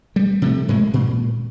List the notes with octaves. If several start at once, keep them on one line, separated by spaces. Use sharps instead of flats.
G3
C3 F3 A3
G#2 G#3 A#3
A#2